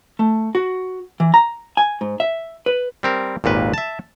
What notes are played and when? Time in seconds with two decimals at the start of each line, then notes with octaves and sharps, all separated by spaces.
0.19 A3
0.55 F#4
1.20 E3
1.34 A#5
1.77 G#5
2.01 G#2
2.20 E5
2.66 B4
3.03 G3 C4 A#4
3.44 G#1 D#2 A#2 B4
3.74 E5 A5